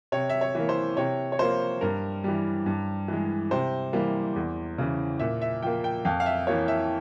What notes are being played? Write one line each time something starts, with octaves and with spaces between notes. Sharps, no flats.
C3 C#5
E5
C#5
E3 A#3
C5
C3 C#5
C#5
F3 A#3 C5
G2 A#4
E3 G3
G2
E3 G#3
C3 C5
E3 G3 A#3
E2
C#3 E3
A#2 E5
E5
F3 A#3 G5
G5
F2 F5
F5
E5
E3 A#3 C#5
E5